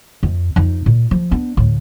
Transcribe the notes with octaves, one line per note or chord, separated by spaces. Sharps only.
F2
F2 D#4
A#2
F3
B3 D4
D2 A2